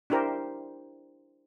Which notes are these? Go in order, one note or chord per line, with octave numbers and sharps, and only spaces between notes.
D4 E4 G4 A#4 C5